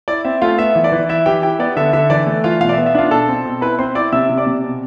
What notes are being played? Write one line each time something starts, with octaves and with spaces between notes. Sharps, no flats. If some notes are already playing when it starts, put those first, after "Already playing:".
E4 D5
C4 E5
A3 F4 F5
B3 E5
E3
D5
E3
E4 E5
E3 G4 G5
E4 G4 G5
B3 D5
D3 E5
D3 E5
E3 D5
A3
E3 F4 F5
B2 F4 F5
D5
E5
B3
E5
D4 F4 F5
B2 A4 A5
C4
B2
E4 B4 B5
C4 C5 C6
E4 D5 D6
C3 E5 E6
C3
D5 D6
C3
B2